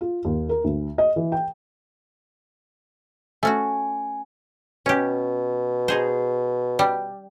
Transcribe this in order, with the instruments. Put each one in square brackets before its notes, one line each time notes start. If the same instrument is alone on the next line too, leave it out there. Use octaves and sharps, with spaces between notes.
[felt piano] F4
D#2
A#4
D2
D#5
E3
G5
[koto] A3 C#4 F#4 [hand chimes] G#5
[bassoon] B2 [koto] C#4 G4
[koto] D#4 G#4 C5
G3